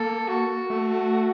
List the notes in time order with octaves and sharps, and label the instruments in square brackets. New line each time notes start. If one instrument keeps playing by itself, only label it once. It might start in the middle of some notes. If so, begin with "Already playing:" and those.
Already playing: [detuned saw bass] A#3 [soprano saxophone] A4
[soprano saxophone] F#4
[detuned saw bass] A3